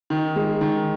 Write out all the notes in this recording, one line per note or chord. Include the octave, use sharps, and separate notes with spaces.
D#3
G#3
D#3